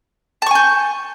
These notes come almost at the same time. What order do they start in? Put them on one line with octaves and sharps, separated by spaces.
A5 C#6 G#5 G6